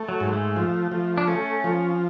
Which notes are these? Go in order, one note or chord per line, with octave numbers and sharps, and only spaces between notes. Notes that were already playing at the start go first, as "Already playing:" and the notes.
Already playing: A3
F#3
G#2
A3
F3
F3
D4
A3 C#4
F3